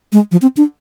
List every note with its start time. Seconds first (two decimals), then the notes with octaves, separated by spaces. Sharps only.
0.13 G#3
0.32 F3
0.42 C4
0.57 D4